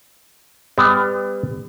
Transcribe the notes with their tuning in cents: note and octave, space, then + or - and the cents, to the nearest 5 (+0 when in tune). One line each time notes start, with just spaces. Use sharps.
G3 +30 B3 +30